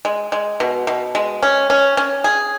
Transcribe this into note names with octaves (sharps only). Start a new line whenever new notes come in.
G#3
G#3
B2
B2
G#3
C#4
C#4
C#4
G#4